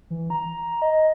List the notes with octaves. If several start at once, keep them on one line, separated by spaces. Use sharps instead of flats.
E3
A#5
D#5